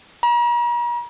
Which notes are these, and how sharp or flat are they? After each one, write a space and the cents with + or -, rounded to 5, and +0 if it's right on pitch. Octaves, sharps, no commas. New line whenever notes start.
A#5 +45